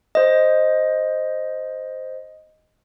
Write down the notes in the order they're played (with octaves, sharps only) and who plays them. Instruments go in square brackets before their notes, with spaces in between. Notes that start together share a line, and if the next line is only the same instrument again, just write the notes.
[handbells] C5 D#5